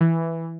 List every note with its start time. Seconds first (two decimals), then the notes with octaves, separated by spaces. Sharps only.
0.01 E3